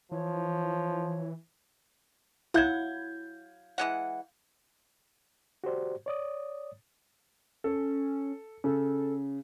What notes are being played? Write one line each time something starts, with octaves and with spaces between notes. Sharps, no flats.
E3 F3 C#5
F#3 E4 F5 F#5 G6 G#6
E3 G#3 F#5
F#4 G4 C5 D5
C#5 D5 D#6
C#4 A4
C#3 A4